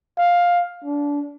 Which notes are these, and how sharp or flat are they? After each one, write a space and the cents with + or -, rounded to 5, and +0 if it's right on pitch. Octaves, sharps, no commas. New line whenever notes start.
F5 +10
D4 -25